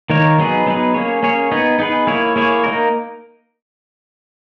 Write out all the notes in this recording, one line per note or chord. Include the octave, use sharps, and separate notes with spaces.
D#3 A#3 D#4 A#4 C#5
F#3 B3 D#4 G#4 B4
F#3 B3 D#4 G#4 B4
A#3 C#4 G#4 C#5
A#3 C#4 G#4 C#5
B3 D#4 G#4 B4
B3 D#4 G#4 B4
A#3 E4 G#4 C#5
A#3 E4 G#4 C#5
A#3 D#4 A#4